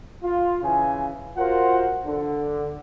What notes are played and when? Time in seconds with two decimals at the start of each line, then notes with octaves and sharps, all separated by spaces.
0.23 F4
0.62 C#3 E3 G#5
1.37 F4 F#4 A#4 C5 F#5
2.05 D3